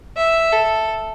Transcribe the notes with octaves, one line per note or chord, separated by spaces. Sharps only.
E5
A4